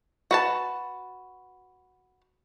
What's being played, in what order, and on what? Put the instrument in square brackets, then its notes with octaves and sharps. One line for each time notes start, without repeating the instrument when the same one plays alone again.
[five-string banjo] F#4 B4 A5